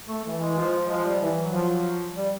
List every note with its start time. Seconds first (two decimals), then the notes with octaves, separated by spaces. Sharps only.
0.08 A3
0.24 E3 A3
0.40 G#3
0.56 F3
0.88 F3 G#3
1.04 G3
1.20 E3 G3
1.36 F#3
1.52 F3
2.16 G3